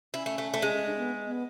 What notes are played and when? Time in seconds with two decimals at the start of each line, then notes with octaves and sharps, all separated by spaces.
0.14 C#4 E4
0.26 A3
0.38 A3
0.54 A3
0.62 G#3 C#4
0.74 C#4
0.86 D4
0.94 C#4
0.98 B3
1.26 B3